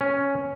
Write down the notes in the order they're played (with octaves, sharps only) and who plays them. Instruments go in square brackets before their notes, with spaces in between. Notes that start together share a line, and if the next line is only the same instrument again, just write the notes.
[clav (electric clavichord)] C#4